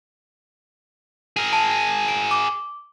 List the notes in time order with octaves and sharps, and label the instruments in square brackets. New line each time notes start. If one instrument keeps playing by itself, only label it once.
[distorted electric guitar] G#4 A#4
[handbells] A5
D7
D6